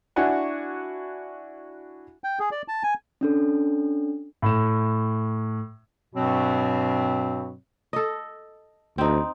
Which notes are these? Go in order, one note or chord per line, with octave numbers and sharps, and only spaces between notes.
D4 E4 F#4 F#5 G#5
G5
G#4
D5
A5
G#5
C#4 D4 A4
A2 E7
G2 B2 F#3 C4
A4 D#5
D2 C4 D#4